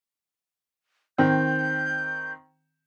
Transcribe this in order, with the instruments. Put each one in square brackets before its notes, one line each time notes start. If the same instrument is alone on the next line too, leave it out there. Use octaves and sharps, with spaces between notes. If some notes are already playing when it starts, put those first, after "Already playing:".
[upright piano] D#3 C4 [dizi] G6